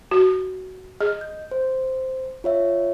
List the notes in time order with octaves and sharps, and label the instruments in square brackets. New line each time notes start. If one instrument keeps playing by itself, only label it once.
[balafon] F#4
[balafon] G#4 [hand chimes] D#5
[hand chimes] G6
C5
F4 C#5 E5